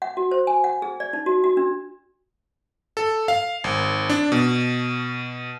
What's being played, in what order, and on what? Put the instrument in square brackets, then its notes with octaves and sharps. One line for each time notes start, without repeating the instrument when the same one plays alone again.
[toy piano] F#5
F#4
C5
G#5
F#5
G#4
D5
D#4
F#4
F#4
D4
[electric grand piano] A4
F5
G#1
D4
B2